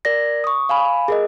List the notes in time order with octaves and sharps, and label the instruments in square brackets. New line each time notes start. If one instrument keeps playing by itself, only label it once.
[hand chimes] A#4 D5 A#6
C#6 D#6
F5 G#5 B5
G#4 A#4 D#5